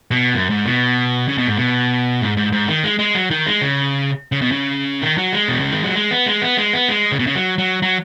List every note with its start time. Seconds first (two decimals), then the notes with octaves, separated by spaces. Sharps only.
0.11 B2
0.34 F#2
0.50 G#2
0.66 B2
1.28 C#3
1.38 B2
1.47 G#2
1.58 B2
2.22 G#2
2.37 G#2
2.52 G#2
2.68 D#3
2.84 G#3
2.99 G#3
3.15 F#3
3.30 D#3
3.46 G#3
3.61 C#3
4.32 C#3
4.42 B2
4.52 C#3
5.02 D#3
5.17 F#3
5.33 G#3
5.48 B2
5.60 C#3
5.71 D#3
5.83 F#3
5.95 G#3
6.11 B3
6.26 G#3
6.42 B3
6.57 G#3
6.73 B3
6.88 G#3
7.12 C#3
7.19 B2
7.27 C#3
7.35 F#3
7.58 F#3
7.82 F#3